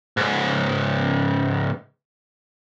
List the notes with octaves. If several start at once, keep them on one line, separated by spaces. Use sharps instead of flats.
C#2 G#2